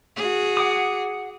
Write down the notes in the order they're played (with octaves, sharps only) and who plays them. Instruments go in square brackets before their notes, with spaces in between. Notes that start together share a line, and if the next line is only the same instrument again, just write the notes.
[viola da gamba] F#4 G#4
[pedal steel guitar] F#5 D6 D#6